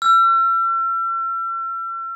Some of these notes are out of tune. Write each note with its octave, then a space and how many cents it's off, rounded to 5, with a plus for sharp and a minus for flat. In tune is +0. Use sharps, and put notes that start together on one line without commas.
E6 +40